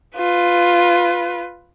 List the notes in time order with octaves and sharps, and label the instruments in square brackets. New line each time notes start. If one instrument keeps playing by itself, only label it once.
[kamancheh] F4 B4